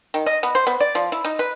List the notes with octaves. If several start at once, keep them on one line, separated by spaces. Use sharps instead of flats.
D#3
D#5
B3
C5
B3
D5
F3
E4
D#4
B4